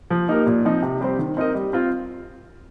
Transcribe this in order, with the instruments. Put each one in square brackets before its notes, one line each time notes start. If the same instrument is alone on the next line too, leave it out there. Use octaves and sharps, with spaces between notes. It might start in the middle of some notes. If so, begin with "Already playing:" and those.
[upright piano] F3
A#3 D#4 G4 A#4
A#2
F3 C4 D#4
C3
G3 C4 G4 C5
D#3
C4 D#4 A#4 D#5
G3
C4 F4